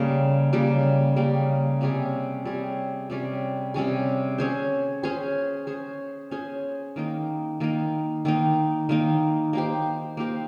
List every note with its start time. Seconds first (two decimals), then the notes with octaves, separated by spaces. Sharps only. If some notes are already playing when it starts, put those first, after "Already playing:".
Already playing: C#3 G3 A#3
0.53 C#3 G3 A#3
1.16 C#3 G3 A#3
1.81 C3 G3 C#4 G#4
2.45 C3 G3 C#4 G#4
3.10 C3 G3 C#4 G#4
3.74 C3 G3 C#4 G#4
4.38 C#4 G#4 C5
5.03 C#4 G#4 C5
5.67 C#4 G#4 C5
6.31 C#4 G#4 C5
6.96 D#3 A#3 D#4
7.60 D#3 A#3 D#4
8.25 D#3 A#3 D#4
8.89 D#3 A#3 D#4
9.53 A#3 D#4 G4 C5
10.17 A#3 D#4 G4 C5